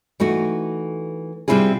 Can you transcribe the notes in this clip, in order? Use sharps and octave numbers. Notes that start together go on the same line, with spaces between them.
E3 A3 D#4 F#4
C3 G3 C4 E4 F4 G#4